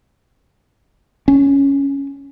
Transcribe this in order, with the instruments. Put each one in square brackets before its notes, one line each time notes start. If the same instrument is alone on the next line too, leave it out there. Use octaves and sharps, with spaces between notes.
[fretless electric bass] C#4